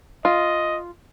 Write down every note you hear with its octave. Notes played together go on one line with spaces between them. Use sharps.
F4 D#5